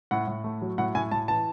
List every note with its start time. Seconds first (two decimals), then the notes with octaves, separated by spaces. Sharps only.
0.11 A2 F#5
0.27 A2
0.44 A3
0.62 F#3
0.78 A2 F#5
0.95 A2 G#5
1.11 A2 A5
1.28 E3 A5